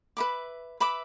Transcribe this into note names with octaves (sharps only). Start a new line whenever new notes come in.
B4 E5 B5 D6
B4 E5 B5 D6